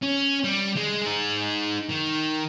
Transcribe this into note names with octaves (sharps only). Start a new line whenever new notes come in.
C#4
G3
G#3
D#4 G#4
D#3